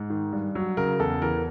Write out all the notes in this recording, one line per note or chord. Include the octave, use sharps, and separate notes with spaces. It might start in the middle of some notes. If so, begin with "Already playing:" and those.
Already playing: G#2
D#3
G2
F#3
C#3 A#4
E2 A4
E3 A#4